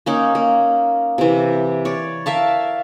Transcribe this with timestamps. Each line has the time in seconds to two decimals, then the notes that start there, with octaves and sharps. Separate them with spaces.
0.06 A#3 C#4 D#4
0.35 A#3
1.18 C3 E3
1.85 C#5 D5
2.26 A#4 E5 F5 A5